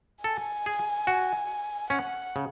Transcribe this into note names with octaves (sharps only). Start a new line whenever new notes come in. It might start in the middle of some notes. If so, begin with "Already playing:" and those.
A4 G#5
G#4
F#4
C#4 F#5
C#3